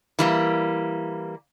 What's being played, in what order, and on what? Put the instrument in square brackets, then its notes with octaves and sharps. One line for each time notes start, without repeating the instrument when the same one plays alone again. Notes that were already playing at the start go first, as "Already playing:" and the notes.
[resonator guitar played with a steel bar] E3 G3 A#3